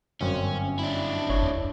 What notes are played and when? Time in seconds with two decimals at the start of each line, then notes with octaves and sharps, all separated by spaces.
0.21 G1 F#2 C4 C#4
0.79 D4 E4
1.29 G1 C#5
1.43 E2